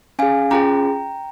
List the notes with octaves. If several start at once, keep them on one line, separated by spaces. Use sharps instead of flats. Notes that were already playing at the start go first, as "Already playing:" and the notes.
C#4 G#4 F5 G#5
C#4 F4 G#4 G5 A#5